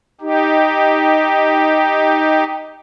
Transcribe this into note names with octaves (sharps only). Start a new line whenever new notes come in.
D#4 G4